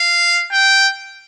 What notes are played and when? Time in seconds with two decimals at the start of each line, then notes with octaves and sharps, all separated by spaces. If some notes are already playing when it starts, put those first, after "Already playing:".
Already playing: F5
0.52 G5